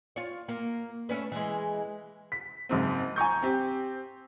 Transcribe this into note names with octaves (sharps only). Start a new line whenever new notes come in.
F4 C#5
A#3
A3 C#4 B4
E3 G#3
B6
F#1 G#2 C4
G#5 A#5 C#6 G6
C4 G4